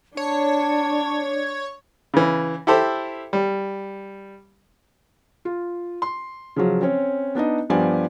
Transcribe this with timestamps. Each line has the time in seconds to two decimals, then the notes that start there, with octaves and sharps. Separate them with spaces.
0.17 D4 C#5 A5
2.14 C#3 E3
2.67 E4 G4 A4 C5
3.33 G3
5.45 F4
6.02 C6
6.56 C#3 F3 F#3
6.82 C4 C#4 C#5
7.35 B3 D4 D#4 D#5
7.70 G2 F3 B3 G4 D5 G#5